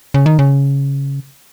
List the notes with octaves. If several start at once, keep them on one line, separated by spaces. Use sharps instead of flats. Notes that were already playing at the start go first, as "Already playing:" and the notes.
C#3
D#3
C#3